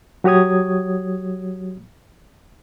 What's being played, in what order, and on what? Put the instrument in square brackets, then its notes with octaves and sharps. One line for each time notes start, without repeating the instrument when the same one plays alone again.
[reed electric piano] F#3 F#4 G4 C#5 D#6 G#6